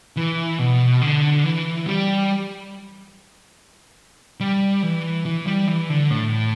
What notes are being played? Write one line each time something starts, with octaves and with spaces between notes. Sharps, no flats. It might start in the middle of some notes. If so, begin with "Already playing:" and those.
E3
B2
D3
E3
G3
G3
E3
E3
G3
E3
D3
A2